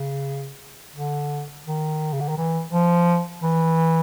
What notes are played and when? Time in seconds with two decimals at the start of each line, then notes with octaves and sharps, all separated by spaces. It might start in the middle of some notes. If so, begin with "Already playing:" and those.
Already playing: C#3
0.95 D3
1.67 D#3
2.13 C#3
2.21 D3
2.29 D#3
2.38 E3
2.72 F3
3.43 E3